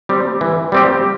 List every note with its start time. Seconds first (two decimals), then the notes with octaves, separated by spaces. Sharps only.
0.09 G3 C4 G4
0.41 E3
0.72 G3 C4 G4